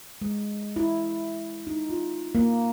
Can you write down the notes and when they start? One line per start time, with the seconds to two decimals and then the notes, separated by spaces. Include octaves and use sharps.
0.21 G#3
0.76 E4
1.67 D#4
1.89 F4
2.35 A#3